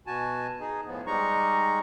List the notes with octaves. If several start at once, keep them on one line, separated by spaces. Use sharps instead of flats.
B2 F#4 G#5 A5
D#4 G#4
A2 F3 B3
G3 G#3 D#4 A#5 C#6